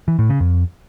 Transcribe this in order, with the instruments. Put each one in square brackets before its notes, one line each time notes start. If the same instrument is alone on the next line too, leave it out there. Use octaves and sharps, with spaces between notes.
[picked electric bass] E3
A2
C#3
F2